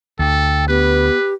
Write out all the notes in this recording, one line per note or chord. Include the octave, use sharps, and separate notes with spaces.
D2 A4 G5
B3 G4 B4